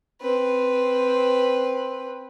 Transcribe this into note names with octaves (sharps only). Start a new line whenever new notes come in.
C4 B4